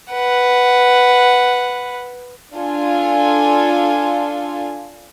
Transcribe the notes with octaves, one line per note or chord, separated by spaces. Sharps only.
B4 F#5
D4 F4 A4 G#5